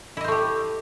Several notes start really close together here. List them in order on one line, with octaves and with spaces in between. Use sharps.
E4 D#5 C5 A3 G4